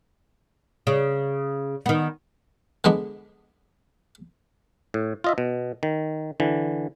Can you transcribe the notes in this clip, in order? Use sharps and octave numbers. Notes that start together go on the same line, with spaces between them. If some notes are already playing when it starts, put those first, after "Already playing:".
C#3
D#3 B3
D3 G#3 B3 D4
A2
F4 D#5 E5
B2
D#3
D3 E3